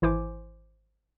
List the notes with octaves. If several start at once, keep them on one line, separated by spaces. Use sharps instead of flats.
G#1 E3 E4 C5 G#5 D6